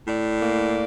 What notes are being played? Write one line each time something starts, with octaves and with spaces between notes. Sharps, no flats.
A2 D5
A#3